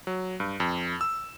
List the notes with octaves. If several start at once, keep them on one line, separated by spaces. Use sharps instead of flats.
F#3
G2
F2
E6